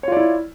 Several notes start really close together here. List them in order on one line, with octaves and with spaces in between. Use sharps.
C#5 F4 D5 E4